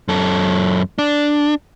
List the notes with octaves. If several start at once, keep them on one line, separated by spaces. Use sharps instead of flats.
F#2 A4
D4